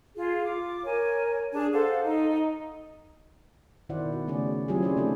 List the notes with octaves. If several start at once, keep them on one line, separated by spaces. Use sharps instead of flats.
F4 G#4
F4 D6
A#4 C#5 G#5
D4 G#4 A5
A4 C5 F5 F#5
D#4
B2 D#3 E4 C5 D5 F#5
F#4
C#3 A3 C#4 G#4 D5
F#3 C4 E4 F4 G4 G#4
C#4 G#4 C5 D5
C3 A3 D#4 G#4 A4 D5